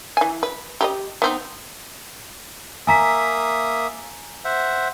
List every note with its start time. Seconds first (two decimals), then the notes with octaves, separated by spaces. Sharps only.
0.17 E3 G#5
0.43 B4
0.81 G4 B4 D#5
1.22 B3 C4 D#4
2.87 A#3 E5 G#5 A#5 D#6 B6
4.45 C5 E5 F#5